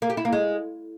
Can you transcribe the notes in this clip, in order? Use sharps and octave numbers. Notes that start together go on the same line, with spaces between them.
A#3
G4
E4
A#3
G#3